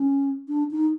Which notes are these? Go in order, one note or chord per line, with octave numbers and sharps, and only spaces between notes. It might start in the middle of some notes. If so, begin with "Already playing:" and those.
Already playing: C#4
D4
D#4